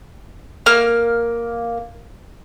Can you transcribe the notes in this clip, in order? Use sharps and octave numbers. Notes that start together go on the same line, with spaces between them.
A#3 F6